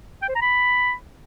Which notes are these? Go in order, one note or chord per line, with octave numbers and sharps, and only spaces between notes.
G5
C5
A#5
B5